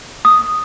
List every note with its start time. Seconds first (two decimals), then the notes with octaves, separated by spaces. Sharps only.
0.25 D#6